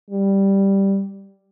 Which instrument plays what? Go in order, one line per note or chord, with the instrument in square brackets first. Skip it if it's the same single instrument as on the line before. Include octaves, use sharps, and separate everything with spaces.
[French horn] G3